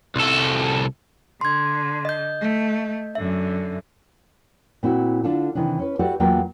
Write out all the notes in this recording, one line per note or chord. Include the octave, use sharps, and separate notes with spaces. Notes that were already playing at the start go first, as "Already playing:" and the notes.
C2 A4
D3 C6 G#6
D#5 G6
A3
F#2 D3 E5
A#2 C4 E4 F#4
D3 D4 F4 A4
C3 D#3 E3 D4
C#4 B4
F#4 G4 A4 B4 D5 F#5
E2 F#3 A#3 F4 A#4 G5